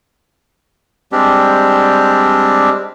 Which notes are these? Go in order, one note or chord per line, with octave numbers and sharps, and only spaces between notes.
G3 G#3 C4 D4 G4